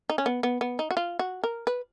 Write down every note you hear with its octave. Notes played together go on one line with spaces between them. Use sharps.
D#4
C#4
B3
B3
B3
D#4
F#4
F4
F#4
A#4
B4